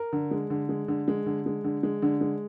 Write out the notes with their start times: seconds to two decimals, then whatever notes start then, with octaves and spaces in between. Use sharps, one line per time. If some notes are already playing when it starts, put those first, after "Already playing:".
Already playing: A#4
0.13 D3
0.31 G#3
0.50 D3
0.69 G#3
0.88 D3
1.08 G#3
1.26 D3
1.46 G#3
1.64 D3
1.83 G#3
2.02 D3
2.21 G#3